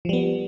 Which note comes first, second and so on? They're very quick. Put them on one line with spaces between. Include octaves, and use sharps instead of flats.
F3 G3 B3